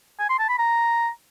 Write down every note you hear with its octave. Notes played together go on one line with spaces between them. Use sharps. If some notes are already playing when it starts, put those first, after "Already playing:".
G#5
C6
A5
B5
A#5